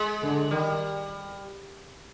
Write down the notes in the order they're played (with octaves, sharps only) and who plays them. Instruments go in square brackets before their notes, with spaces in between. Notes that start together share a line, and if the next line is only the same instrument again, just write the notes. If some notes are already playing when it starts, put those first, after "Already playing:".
Already playing: [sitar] G#3
[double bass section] D3
[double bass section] D#3 [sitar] G3